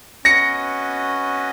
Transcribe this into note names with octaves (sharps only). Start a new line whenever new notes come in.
C#4 F#4 B4 D#5 A#6 C#7